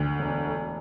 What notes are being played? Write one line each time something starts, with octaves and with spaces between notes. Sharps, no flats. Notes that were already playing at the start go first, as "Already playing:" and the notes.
Already playing: D2 D3
E1
A3